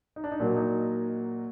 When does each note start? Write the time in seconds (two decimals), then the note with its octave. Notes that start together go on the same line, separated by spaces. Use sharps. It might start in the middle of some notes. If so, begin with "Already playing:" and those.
0.16 D#4
0.24 D4
0.32 D#4
0.40 A#2 F#3 A#3 D4
0.56 D#4